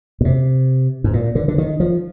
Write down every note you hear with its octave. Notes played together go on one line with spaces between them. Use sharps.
A#2
C3
G#2
A#2
D3
D3
D#3
F3